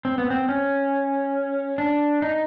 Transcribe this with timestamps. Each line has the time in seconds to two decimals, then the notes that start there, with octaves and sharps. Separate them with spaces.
0.05 C4
0.18 B3
0.30 C4
0.49 C#4
1.78 D4
2.22 D#4